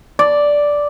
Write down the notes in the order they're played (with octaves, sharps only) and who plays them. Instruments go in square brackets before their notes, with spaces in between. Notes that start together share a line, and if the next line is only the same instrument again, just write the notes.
[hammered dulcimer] D5